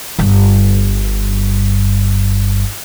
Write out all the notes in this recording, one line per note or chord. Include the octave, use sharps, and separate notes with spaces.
G1 G2